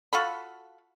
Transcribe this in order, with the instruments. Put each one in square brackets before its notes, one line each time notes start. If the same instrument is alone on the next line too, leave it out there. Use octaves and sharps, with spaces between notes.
[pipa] F4 F#4 A4 B5